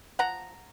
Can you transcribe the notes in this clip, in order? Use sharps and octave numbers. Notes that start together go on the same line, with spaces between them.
F3 F#5 A#5